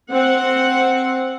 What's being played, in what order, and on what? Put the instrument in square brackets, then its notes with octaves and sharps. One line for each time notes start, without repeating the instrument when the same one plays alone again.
[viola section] C4 F#5